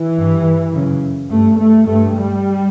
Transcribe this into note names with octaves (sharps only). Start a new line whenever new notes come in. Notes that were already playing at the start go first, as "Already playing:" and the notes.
Already playing: E3
G2
F#2 C#3
G2 A3
A3
G2 A3
G3